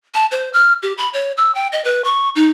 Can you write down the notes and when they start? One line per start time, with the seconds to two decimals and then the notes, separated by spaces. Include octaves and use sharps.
0.14 A5
0.31 C5
0.54 F6
0.83 G4
0.98 B5
1.14 C#5
1.37 E6
1.55 G5
1.72 D#5
1.85 B4
2.04 C#6
2.36 D#4